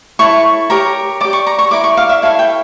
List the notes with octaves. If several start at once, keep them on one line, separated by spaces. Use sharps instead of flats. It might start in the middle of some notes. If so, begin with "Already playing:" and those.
E4 A4 C#5 C#6
G4 A#4 C#5 A#5
G4 D5 D6
C#6
A#5
C#6
E4 A#4 D5 D6
C#6
F5
E5
E4 A4 C#5 F5
G5